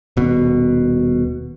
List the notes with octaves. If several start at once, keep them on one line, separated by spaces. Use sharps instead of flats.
D#1 B2